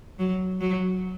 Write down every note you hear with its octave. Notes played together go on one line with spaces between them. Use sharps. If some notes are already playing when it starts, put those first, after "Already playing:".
F#3
F#3